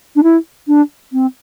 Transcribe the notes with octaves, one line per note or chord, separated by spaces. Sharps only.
D4
E4
D4
C4